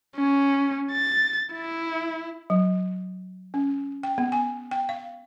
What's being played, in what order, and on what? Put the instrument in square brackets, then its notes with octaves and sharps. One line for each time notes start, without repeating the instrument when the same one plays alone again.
[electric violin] C#4
A6
E4
[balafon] F#3
C#4
G5
B3
G#5
G5
F5